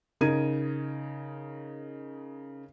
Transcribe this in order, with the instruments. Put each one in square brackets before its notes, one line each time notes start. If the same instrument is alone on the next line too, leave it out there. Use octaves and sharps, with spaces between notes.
[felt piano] C#3 D#4 A#4 G#6 D#7